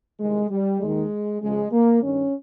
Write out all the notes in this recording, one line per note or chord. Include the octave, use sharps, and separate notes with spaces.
C2 C3 D#3 G#3
G3
D#2 D#3 G#3
C#2 C#3 F3 G#3
A#3
G2 D#3 C#4